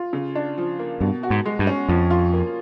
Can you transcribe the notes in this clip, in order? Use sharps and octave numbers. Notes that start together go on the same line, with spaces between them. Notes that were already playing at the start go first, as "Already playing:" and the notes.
Already playing: F4
C#3
D4
F3
A#3
G2 B2
F#4
G#2
G#3
G2
C#4
F2 F3
F4
A#3